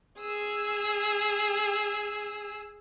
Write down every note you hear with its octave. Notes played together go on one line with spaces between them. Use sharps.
G#4 E6